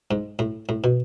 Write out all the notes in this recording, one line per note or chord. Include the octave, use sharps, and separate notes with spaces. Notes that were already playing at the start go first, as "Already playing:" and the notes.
G#2
A2
A2
B2